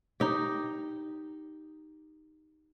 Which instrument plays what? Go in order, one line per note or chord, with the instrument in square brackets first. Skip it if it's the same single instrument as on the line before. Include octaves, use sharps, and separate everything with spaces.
[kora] D#4 G4